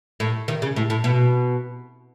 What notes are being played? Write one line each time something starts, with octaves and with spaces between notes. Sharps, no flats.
A2
D#3
C#3
A2
A2
B2